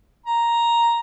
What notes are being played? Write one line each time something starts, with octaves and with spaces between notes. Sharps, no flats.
A#5